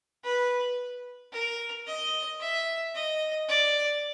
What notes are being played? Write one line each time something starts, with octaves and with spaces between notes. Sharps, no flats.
B4
A#4
D#5
E5
D#5
D5